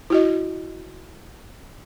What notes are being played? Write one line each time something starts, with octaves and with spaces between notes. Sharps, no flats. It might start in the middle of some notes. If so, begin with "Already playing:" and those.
E4 F#4 D#5